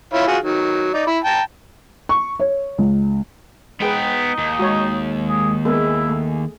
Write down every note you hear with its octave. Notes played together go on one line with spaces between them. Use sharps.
E4 F4 C#5
F4 F#4 G#4
D#3 F#3
D#4 D5
E4
G5 A5 A#5
C#6
C#5
C#2
G#3 B3 D#4 G#4 B4 G5
D#2
G#3 F#4 C#5
G#4
G#3 B3 E4 G#4 A#4
A3